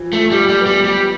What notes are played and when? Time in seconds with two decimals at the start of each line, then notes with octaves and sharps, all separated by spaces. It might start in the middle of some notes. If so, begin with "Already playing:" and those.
Already playing: E3 F3
0.13 F3 A3
0.31 G3
0.37 A3
0.49 G3
0.61 B3
0.66 G3
0.85 G3